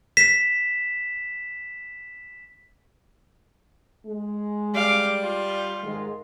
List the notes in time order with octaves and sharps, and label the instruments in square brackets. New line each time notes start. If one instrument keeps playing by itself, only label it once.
[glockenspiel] B6 E7
[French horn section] G#3
[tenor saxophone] G3 [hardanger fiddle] F5 D6
[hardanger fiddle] F4
[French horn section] G#2 D#3 G#3